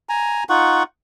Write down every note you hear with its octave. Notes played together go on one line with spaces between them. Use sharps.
G#5 A#5
D#4 F4 F#5 C#6